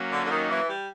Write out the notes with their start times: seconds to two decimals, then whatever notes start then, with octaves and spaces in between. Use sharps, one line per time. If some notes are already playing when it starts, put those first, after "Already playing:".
Already playing: F#3 A#3 C#4 F#4
0.12 D3
0.25 D3
0.31 D#3
0.49 E3
0.68 G3